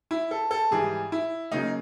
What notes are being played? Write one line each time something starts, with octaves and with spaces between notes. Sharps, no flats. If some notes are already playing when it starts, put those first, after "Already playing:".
E4
A4
A4
G#2 E3 G3 G#4
E4
C#3 F#3 A#3 D#4